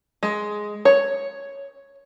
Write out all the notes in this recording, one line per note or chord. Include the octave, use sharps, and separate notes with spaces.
G#3
C#5